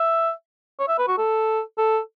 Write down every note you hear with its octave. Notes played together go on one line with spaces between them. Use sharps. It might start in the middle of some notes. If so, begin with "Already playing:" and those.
Already playing: E5
C#5
E5
B4
F#4
A4
A4